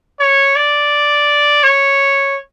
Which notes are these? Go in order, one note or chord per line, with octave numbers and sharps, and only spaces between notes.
C#5
D5
C#5